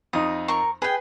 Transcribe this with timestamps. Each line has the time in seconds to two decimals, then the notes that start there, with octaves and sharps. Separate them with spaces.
0.13 F2 D#4 D#6
0.48 A#4 A#5 C#6
0.82 G#4 B4 G5 G#5